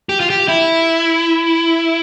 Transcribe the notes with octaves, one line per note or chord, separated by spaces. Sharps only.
G4
F4
G4
E4